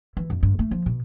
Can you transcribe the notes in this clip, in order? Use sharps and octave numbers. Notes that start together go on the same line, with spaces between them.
E3
F2
G2
A3
F3
B2